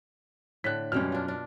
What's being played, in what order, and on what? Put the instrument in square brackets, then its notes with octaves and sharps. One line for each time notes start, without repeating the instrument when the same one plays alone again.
[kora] A2 D3 [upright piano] F#6 B6
[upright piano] F#2 F6 [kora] B2 G3 C#4
[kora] D4 F4
D4